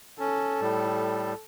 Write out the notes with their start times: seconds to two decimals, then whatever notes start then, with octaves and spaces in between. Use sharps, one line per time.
0.20 C#4 A4
0.61 A2 G3